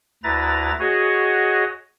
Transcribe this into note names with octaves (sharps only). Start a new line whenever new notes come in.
D2 E4 B4 A#5 A6
F#4 G#4 C#5 D#5 F#5